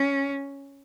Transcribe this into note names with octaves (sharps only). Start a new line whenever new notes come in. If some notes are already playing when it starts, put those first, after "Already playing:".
Already playing: C#4